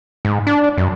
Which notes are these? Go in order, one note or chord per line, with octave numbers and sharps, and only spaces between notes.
G#2
D4
F#2